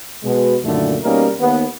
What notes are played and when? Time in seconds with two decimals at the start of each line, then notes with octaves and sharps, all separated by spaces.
0.24 B2 G#3
0.64 F#2 A#2 D3 D#3 A3
1.03 B2 G3 A#3 C#4 D#4 A#4
1.40 D#2 B3